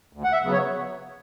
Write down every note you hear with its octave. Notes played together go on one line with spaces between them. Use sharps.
D2
F#5
E5
C#3 F#3 B3
C#5